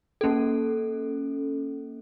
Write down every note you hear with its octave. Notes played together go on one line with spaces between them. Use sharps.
A#3 C#4 A4